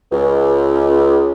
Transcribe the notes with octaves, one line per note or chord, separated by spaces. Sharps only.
C#2